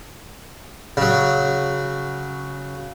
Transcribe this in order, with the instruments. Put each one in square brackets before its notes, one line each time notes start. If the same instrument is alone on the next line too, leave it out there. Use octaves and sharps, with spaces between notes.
[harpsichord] C#3 F#3